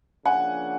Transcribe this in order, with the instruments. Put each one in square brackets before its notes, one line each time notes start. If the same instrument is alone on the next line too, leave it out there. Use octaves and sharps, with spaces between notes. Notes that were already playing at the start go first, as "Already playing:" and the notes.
[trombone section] C#3 F3 A#3 D4 [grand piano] F#5 G#5